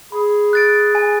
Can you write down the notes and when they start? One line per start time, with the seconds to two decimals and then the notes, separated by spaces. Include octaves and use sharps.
0.12 G#4 B5
0.53 F#6 A6 D7
0.95 G#5